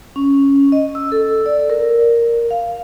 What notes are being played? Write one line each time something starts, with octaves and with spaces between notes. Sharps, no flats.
C#4
D#5
E6
A4
D5
A#4
F5